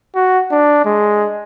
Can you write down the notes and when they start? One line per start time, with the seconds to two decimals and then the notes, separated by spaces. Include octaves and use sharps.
0.15 F#4
0.52 D4
0.85 G#3